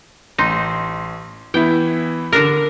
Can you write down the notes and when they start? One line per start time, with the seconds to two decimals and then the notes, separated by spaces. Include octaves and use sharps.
0.38 A1 D#4 C6
1.54 E3 B3 E4 G5
2.32 D3 D4 A#4